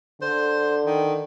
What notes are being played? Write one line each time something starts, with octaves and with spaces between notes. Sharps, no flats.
D3 C5
D#3